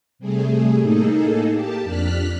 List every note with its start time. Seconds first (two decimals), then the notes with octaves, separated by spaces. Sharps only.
0.19 C3 G3 A3 G#4
0.82 A2 A#3 D#4 G#4 A4
1.52 A#3 G4 A5
1.83 F2 D4 F6 F#6 B6